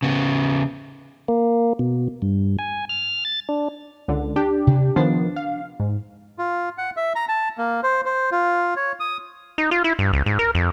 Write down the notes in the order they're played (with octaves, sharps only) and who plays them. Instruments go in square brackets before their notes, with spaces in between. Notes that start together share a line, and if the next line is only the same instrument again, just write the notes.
[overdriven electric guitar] C#3 B3
[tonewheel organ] A#3
B2
G2
G#5
F6
A6
D4
[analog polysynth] C#2 D3
D4 G4
[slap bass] C3
[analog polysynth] D#3 F3 B3 [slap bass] D4
[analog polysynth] F5
G#2
[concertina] F4
F#5
E5
A#5
A5
A#3
C5
C5
F4
C#5
D#6
[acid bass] D#4
F4
E4
G2
C#2
G#2
A#4
F2